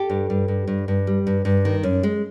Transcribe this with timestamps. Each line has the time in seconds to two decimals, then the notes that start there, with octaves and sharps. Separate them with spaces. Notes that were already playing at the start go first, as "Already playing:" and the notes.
Already playing: G4 A4
0.10 G2
0.30 G2
0.48 G2
0.67 G2
0.88 G2
1.07 G3
1.27 G2
1.45 G2
1.65 D#3
1.83 F#2
2.03 G#3